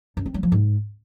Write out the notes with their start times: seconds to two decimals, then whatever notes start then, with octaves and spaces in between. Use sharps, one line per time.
0.17 F#2
0.26 C4
0.34 F#3
0.43 F3
0.52 G#2